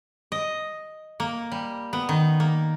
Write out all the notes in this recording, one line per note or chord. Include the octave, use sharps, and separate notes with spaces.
D#5
A#3
G3
B3
D#3
A#3